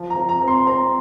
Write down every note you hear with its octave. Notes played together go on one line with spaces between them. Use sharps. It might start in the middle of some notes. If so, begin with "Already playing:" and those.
Already playing: F3
A#5
F3
A#5
C4
C6
C4 A#5